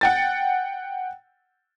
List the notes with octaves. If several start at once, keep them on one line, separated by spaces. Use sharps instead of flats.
F#5 G5 A6